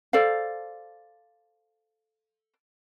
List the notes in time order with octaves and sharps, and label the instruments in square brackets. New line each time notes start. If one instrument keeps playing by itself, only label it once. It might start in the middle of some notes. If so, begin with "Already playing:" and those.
[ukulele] A4 C5 D5 F5